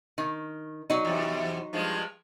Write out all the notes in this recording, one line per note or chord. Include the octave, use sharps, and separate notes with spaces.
D#3
F#3 D#4
E2 C3
G2 F3 G#3